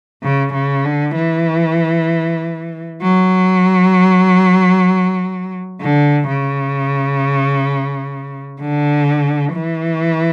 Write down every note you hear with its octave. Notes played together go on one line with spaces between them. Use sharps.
C#3
C#3
D3
E3
F#3
D3
C#3
D3
E3